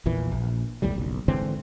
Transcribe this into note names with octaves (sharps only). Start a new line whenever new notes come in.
A#1 E2 A#2 E3
A#1
B1 E2 A2 G3
F#1 B1
G#2 D3 E3 C4